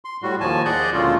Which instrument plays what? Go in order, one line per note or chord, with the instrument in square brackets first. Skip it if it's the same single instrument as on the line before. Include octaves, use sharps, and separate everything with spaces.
[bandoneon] C6
A2 G3 F#4
D#2 F3 G#5 A5
G#4 D5 D#5 F#5 G6
D2 A#2 C#3 G#3 A3 F4